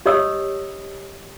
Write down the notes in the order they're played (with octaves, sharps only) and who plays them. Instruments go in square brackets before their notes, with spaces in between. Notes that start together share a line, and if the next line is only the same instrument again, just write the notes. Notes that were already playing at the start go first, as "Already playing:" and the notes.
[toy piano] G4 C#5 D#5 B5 D#6 E6